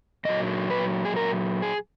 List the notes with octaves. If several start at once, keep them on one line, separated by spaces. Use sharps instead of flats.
A#2 F#3 D#5
B4
G#4
A#4
G#4